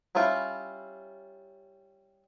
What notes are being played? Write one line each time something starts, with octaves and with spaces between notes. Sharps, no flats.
G3 C#4 E4 F4 G5